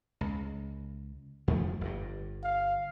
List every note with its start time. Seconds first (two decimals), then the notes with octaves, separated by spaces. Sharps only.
0.21 C#2
1.48 F2 F3 A3
1.81 G1 G2
2.43 F5